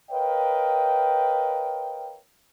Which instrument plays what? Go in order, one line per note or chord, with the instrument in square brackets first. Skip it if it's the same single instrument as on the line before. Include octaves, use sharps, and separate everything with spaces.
[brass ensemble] A#4 B4 C#5 D#5 F5 G5